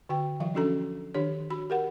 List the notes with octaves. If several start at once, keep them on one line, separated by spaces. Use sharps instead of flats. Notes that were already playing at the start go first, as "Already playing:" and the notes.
D3 F#4 G5
E3 F#3 F5
F3 C#4 D4 F#4 A4 A#5
D#3 D4 G4 C#5
F#4 B5
G4 A#4 F#5